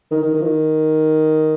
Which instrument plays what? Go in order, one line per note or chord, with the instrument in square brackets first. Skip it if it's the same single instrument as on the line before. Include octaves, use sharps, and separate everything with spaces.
[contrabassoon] D#3
D#3
D#3
F3
D#3